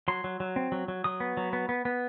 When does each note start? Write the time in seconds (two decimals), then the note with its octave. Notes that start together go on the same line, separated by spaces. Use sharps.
0.08 F#3 C6
0.24 F#3
0.40 F#3
0.56 C4
0.72 F#3
0.88 F#3
1.04 F#3 D#6
1.20 B3
1.37 F#3
1.53 B3
1.69 B3
1.85 B3